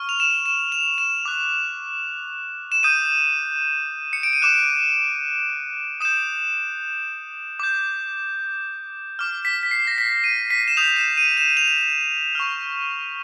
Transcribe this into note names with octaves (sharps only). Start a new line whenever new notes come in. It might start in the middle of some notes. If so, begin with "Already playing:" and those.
Already playing: C#6 F6
F7
E7
E7
F7
E7
D6 F#6
E7
D#6 G6 D#7
C#7
D7
D#7
D6 F#6 E7
D#6 G6 E7
D6 G6
D6 F6
B6
B6
C7
A#6
B6
D#7
B6
E7
D#6 G6 F7
E7
D#7
E7
F7
C#6 F6